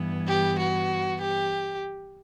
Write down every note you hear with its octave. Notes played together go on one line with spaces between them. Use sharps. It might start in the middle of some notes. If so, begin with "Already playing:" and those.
Already playing: G2 E3 B3
G4
F#4
G4